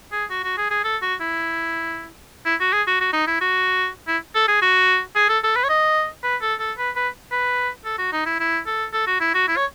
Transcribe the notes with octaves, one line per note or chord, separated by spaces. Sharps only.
G#4
F#4
F#4
G#4
G#4
A4
F#4
E4
E4
F#4
G#4
F#4
F#4
D#4
E4
F#4
E4
A4
G#4
F#4
G#4
A4
A4
B4
C#5
D#5
B4
A4
A4
B4
B4
B4
A4
F#4
D#4
E4
E4
A4
A4
F#4
E4
F#4
E4
C#5